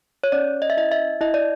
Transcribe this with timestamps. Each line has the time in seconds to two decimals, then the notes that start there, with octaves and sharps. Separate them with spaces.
0.24 C#5
0.32 C#4 D5
0.62 D#5
0.70 E5
0.77 E4 D#5
0.91 E5
1.21 E4 D#5
1.34 D5